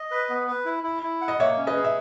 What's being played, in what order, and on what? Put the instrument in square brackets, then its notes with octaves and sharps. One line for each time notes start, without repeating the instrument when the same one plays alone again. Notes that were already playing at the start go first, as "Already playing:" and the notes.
Already playing: [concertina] D#5
B4
B3
B4
E4
E4
E4
F#5
[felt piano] D#5
[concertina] A#3 [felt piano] C#5 E5
[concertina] C#4
[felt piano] B4 D#5
[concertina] G#4
[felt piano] E5